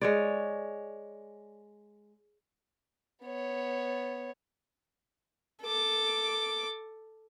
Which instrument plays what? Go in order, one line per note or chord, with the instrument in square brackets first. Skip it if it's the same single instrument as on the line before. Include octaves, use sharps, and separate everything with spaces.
[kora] G#3 C#5 D5
[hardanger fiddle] B3 C#5
[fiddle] A4 D6